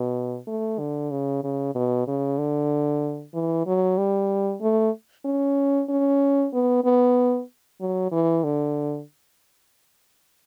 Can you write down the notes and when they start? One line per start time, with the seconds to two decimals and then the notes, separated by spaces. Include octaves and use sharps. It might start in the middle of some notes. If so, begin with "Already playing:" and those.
Already playing: B2
0.48 A3
0.79 D3
1.11 C#3
1.44 C#3
1.75 B2
2.08 C#3
2.39 D3
3.34 E3
3.67 F#3
3.98 G3
4.62 A3
5.25 C#4
5.89 C#4
6.54 B3
6.84 B3
7.81 F#3
8.12 E3
8.44 D3